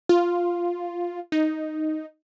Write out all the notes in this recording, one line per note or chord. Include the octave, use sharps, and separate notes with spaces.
F4
D#4